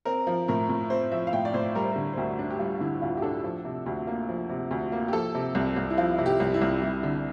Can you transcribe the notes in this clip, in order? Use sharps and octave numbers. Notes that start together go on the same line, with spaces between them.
C4 A#4
F3
A2 A#4
A2
C4 C5
F3 E5
F5
A2 G5
D5
A2 C5
G3 A#4
C5
A#4
D3
C5
D2 A#4
D4
G4
G3 F4
D3 E4
D2 F4
G4
D4 A4
F3
C3
D2
A#3
F3
C3
D2
A#3
G4
F3 A4
C3
C2
C2
E4
F3 F4
C3
G4
C2
E4
C2
G3 E4
D3